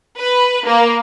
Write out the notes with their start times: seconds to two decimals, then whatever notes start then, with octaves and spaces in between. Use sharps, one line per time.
0.18 B4
0.65 A#3